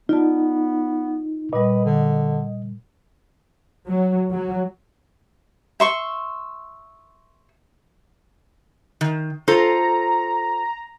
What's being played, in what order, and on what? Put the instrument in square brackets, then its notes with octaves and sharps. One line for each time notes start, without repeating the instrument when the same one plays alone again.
[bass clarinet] B3 [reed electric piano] D#4 [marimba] F4 D5 A5
[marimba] A#2 G3 [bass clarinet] B4 [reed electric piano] D#5
[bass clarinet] D3
[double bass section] F#3
F#3
[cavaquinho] E5 C6 C#6
[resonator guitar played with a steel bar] D#3
[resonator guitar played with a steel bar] F4 A4 C5 [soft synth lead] A#5